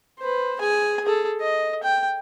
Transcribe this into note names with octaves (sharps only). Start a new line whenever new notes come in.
B4 C5
G#4 G#5
G#4 A4
D#5
G5